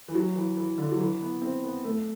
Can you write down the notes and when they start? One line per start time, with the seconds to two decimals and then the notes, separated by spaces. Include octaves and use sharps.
0.08 E3
0.15 F#3
0.36 E3
0.57 E3
0.78 D3
0.91 F#3
1.00 E3
1.21 B3
1.42 C4
1.64 B3
1.84 A3